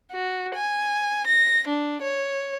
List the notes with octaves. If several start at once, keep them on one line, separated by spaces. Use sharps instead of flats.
F#4
G#5
A#6
D4
C#5